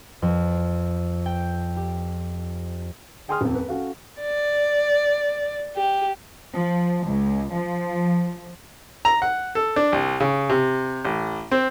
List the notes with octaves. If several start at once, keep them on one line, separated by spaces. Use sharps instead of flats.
F2
G5
G4
G#4 G5 G#5 C6 D#6 F6
D#1 F2
B4
C#4 F#4 A4 F5
D5
G4
F3
C#2
F3
A#5
F#5
A4
D4
C2
C#3
C3
A1
C4